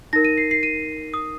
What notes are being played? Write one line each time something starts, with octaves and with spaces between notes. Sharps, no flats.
D#4 A#4 A#6
D#7
C7
C7
D#7
D#6